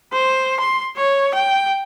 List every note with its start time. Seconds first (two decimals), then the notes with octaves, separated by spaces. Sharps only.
0.13 C5
0.60 C6
0.97 C#5
1.34 G5